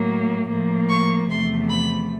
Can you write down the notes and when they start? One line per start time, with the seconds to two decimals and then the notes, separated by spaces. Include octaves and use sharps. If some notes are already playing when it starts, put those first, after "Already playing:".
Already playing: A2 F#3 A#3
0.48 A2 F3 A#3
0.89 C#6
1.29 E2 C3 F3 A3 C6
1.70 B5